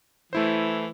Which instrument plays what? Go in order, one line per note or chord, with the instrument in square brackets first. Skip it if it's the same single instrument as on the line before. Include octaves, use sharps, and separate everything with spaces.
[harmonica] E3 [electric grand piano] A3 E4 C5